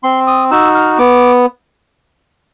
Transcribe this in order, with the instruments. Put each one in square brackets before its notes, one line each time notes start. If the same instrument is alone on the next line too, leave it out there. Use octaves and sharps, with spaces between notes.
[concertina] C4 C6
D#6
D#4 F#4 E6
F6
B3 D6